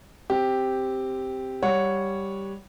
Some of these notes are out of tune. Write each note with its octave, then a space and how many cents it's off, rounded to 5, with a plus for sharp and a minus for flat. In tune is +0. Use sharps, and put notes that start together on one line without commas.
C4 +0 G4 +0
G3 +0 C#5 +0 F#5 -15